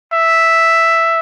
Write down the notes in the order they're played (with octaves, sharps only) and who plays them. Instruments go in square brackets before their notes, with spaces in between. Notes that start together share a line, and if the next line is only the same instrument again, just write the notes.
[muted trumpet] E5